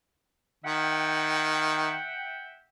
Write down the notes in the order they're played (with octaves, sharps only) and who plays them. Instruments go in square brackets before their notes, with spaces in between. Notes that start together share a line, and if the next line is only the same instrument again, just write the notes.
[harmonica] D#3 [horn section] E5 F#5 G5